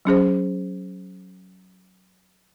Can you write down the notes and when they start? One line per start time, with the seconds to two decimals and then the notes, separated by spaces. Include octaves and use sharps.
0.05 F#3 C#4 G#4 C5